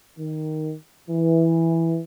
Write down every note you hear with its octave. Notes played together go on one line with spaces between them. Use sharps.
D#3
E3